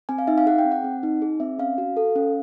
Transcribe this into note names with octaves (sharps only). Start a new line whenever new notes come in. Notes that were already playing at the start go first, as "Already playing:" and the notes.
C4 G#5
F5
D#4 E5
F5
G#4 F#5
G5
C4
F#5
C4
D#4
G#4
C4 E5
C#4 F5
F#4
A4
C#4